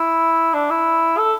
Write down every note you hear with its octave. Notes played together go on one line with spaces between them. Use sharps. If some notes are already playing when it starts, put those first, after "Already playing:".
Already playing: E4
D4
E4
A4